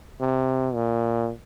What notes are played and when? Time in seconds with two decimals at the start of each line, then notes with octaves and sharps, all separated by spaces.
0.21 C3
0.74 A#2